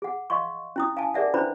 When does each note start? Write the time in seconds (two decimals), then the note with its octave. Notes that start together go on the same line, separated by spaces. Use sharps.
0.02 G#4 F#5
0.30 D#5 F5 C6 C#6
0.76 C#4 E4 D#6
0.97 F5 G#5 A5
1.14 G#4 A#4 D5 E5 F#5
1.34 C#4 D4 E4 B4 C5 B5